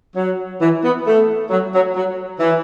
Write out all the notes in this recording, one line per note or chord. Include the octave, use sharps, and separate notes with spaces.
F#3
E3
B3
A3
F#3
F#3
F#3
E3